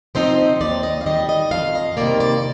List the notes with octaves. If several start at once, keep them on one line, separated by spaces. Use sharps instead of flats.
F3 C4 D#4 C5
D#2 D5
D#5
F5
D#3 G3 D#5
D#5
F2 F5
D#5
C3 D#3 G3 A#3 D5
D5